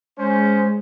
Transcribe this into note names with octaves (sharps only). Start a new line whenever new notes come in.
G#3 C#4 C5